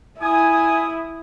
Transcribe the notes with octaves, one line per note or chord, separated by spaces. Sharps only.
E4 G#5 D#6